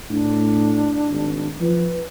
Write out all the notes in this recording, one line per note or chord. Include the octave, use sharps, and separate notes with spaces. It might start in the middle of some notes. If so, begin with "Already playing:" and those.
A2 D4
G#1
F3 B4